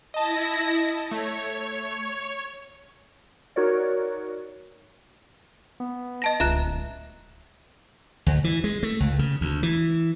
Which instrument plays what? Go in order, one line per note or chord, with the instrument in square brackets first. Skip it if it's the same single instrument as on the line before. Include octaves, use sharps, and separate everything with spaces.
[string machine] E4 A#6 [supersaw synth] D#5 A5
[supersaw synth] A3 [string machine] C#5
[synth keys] D#4 F#4 A#4 C#5 D5
[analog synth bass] B3
[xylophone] D#5 A5 A#6
[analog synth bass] D1 [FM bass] C#2 [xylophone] E5 A#5 F#6
[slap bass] D2
E3
G#3
A3
C#2
C#3
D2
E3